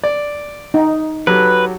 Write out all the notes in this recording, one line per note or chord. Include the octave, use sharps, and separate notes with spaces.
D5
D#4
F#3 G4 A4 B4